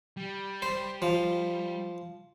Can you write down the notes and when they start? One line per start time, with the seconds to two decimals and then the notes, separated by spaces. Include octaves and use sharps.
0.17 G3
0.62 C5
1.02 F3